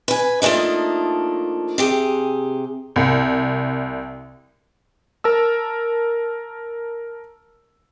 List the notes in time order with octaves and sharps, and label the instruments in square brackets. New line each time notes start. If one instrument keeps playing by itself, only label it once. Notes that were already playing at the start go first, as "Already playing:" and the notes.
[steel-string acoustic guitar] B4 G#5
F3 A3 A#3 D4 D#4
C3 G4 G#4
[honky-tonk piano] C2
[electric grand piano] A#4 A5 E6